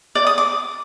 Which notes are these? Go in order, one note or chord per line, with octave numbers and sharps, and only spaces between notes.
D5
D#6
D6